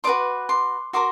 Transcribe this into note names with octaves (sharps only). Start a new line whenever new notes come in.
F#4 B4 D5 C6 D6
C6 D6
F#4 A#4 C6 D6